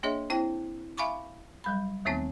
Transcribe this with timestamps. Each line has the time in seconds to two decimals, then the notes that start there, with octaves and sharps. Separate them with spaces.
0.03 A#3 D4 G#4 C#5 D#5 E5
0.30 C4 E4 C5 G5
0.97 E5 F5 G#5 B5 C#6 D6
1.64 F#3 G3 B5
2.05 D#2 D#3 A3 B3 C4 D#4